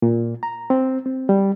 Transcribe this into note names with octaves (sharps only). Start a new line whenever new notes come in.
A#2
A#5
C4
C4
G3